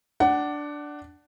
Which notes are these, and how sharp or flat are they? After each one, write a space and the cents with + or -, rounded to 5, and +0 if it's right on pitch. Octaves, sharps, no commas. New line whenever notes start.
D4 +0 F#5 +20